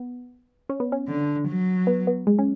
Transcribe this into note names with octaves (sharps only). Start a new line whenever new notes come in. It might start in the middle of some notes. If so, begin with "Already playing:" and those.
Already playing: B3
C#4
B3
C#4
D3
F#3
B3
B3
G#3
C#4